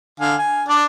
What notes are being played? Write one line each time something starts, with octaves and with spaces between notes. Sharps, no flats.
D3 F5 G#5
G#5
D4 D5